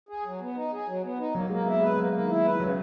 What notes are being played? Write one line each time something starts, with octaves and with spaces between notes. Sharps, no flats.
G#4
F#3
B3
D#4
G#4
F#3
B3
D#4
F#3 A#3
G#3 A#3
B3 E4
G#3 B4
F#3 A#3
A#3
D#3
E4
B4
C#3 F#3